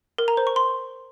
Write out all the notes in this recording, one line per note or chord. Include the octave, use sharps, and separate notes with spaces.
A#4
A#5
C5
C#6
C6